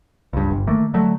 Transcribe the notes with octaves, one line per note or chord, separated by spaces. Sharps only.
C#2 G2
G1
D#3 A3 A#3
D3 F#3 A3